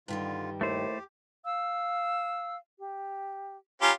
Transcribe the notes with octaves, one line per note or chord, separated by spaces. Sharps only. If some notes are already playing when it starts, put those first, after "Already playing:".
G2 D3 D#3 G3 F4
D#2 A3 E4 G4 C5
F5 E6
G4
C#4 F4 G4 G#5 A#5 B5